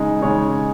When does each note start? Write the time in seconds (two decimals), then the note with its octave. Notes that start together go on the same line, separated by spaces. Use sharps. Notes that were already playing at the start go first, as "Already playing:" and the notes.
Already playing: C#3 G#3 D#4
0.22 C#3 G#3 D#4 C#5